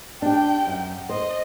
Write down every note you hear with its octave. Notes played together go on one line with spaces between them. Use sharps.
D4 G4 G5
F#2
C5 D#5